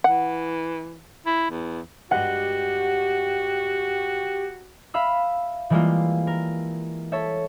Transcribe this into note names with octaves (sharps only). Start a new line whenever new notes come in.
E3 F#5
E4
E2
G2 G#3 F#4 G4 F#5
E5 F5 B5 E6
E3 G3 G#3 A#3 E4 F4
A#4
A4 C#5 E5